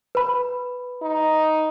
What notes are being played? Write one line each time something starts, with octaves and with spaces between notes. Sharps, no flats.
B4 B5
D#4